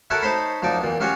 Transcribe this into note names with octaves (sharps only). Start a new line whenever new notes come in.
E4 F#4 A4 A#4 C#5 F#5
D#4 C5 C#5 A5 B5 C6
F#2 F3 D#4 D5 C#6
E2 A#2
F#3 G3 C#4 F4 F#4 C#5